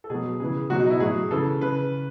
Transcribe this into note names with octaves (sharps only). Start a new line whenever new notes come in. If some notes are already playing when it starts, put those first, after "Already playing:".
A4
B2 F#3 G#4
C#3 E3 G#4
B2 F#3 F#4
D#4
E4
A2 F#3 G#4
C#3 E3 A4
C#3 B4